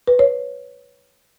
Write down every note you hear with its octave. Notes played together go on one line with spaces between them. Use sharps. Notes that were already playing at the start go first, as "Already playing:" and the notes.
B4
C#5